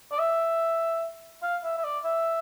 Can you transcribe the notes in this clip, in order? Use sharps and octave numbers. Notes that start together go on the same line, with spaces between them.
D5
E5
F5
E5
E5
D5
E5